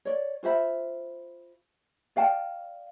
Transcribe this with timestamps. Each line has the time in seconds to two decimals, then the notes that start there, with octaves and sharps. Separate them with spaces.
0.05 C#5 D5
0.43 F4 C5 E5 B5
2.16 D5 F5 G5 A5